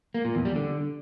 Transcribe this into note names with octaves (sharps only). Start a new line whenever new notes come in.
A#3
A#2
E2
G3
D3